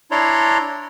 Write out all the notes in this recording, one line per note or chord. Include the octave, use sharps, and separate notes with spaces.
D4 E4 C#5 D5 A#5 C6